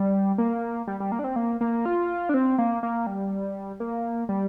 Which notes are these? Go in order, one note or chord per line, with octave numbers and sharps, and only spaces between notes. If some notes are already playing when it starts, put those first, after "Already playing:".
Already playing: G3
A#3
G3
G3
A#3
D4
C4
A#3
A#3
F4
D4
C4
A#3
A#3
G3
A#3
G3